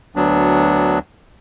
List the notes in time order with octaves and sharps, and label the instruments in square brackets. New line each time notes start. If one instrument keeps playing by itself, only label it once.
[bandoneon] D2 F#3 B3 D4